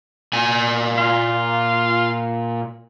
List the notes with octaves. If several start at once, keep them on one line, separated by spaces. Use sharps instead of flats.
A#2 G#5
F4